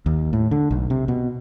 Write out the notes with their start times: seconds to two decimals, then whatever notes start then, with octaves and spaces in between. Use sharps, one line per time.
0.06 D#2
0.33 A2
0.51 D3
0.71 B1
0.90 C3
1.08 B2